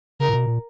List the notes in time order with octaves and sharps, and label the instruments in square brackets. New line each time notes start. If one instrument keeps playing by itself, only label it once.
[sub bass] C#3 [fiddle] A#4
[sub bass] A#2
B2
A#2